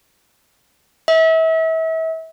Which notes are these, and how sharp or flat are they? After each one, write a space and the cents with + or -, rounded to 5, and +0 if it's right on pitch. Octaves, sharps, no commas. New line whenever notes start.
E5 -35